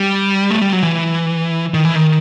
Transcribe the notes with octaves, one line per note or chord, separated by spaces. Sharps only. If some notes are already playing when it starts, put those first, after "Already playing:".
Already playing: G3
A3
G3
F#3
E3
D#3
E3
D#3